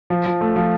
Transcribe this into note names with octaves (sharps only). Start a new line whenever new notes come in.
F3
F3
A3
F3